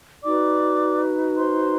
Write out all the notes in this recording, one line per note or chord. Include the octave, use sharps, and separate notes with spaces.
D#4 F#4 B4 D5 D6
C5 C6